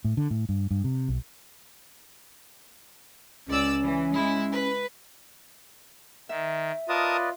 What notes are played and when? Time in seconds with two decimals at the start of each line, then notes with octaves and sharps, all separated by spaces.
0.05 A2
0.17 D3
0.30 A2
0.49 G2
0.71 G2
0.84 C3
1.08 B1
3.48 C#2 C#4 D5 E6
3.84 E3
4.14 G#3 E4
4.53 B4
6.29 D#3 E5
6.89 F4 A#4 B4 D5 D#5 A5 D#6